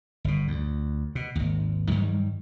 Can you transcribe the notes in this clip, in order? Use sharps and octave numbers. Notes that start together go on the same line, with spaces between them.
G1 B2
D2
B2
G#1 D#2
G2 D#3 F#3 G3